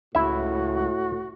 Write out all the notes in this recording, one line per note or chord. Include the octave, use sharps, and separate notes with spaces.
C#2 A2 E4 F#4 E5